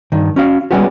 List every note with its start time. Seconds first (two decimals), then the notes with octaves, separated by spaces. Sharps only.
0.12 G2 D#3
0.36 C#4 F#4 F5
0.71 G3 G#3 B3 C#4 F#4 G4